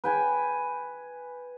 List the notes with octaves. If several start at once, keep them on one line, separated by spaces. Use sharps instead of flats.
B4 G5 G#5